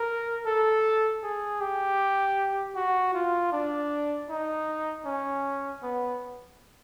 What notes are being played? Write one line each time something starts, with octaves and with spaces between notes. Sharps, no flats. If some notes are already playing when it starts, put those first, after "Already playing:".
Already playing: A#4
A4
G#4
G4
F#4
F4
D4
D#4
C#4
B3